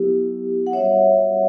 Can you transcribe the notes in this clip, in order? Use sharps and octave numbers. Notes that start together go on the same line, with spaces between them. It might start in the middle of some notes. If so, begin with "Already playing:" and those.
Already playing: F#3 B3 E4 G4
F#5
G3 C#4 F#4 C#5 E5